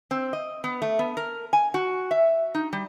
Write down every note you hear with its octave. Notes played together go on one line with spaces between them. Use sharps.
C4
D#5
B3
A3
B3
A#4
G#5
F#4
E5
D#4
G3